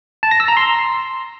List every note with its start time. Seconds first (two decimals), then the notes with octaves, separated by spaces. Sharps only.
0.23 A5
0.31 A#6
0.40 E6
0.48 A#5
0.57 C6